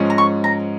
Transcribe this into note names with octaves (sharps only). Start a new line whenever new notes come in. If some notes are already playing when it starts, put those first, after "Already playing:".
Already playing: G#2 F3 G#3 C#4
A#5
C#6
A#5